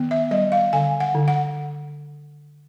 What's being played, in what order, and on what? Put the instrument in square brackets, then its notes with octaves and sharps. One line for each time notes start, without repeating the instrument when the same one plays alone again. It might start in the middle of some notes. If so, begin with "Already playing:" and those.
Already playing: [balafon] D#3 B3
E5
G3 D#5
F5
D3 G#5
F#5
D3
F#5